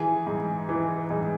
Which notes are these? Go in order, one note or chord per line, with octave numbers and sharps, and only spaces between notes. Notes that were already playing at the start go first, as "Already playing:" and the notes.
Already playing: E3 G#4 G#5
G#2
E3
G#2